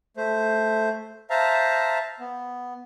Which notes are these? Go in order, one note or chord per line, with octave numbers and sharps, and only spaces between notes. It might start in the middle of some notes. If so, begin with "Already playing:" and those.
A3 C5
C5 E5 F5 A5 A#5
B3